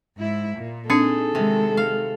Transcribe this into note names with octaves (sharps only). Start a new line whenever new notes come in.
G#2 E4
A#2
C4 D4 D#4 G#4 A4
C3 D#3 G#3
F5